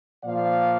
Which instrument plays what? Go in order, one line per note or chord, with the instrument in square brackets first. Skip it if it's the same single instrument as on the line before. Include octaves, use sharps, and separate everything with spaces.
[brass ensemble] A#2 F3 A#3 D5 F5